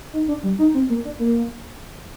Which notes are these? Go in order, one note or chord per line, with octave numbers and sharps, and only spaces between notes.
D#4
D4
G3
D#4
C4
A#3
D4
A#3